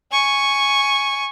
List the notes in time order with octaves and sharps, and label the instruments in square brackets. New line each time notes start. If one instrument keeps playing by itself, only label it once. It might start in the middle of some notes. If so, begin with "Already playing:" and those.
[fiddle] G#5 C#6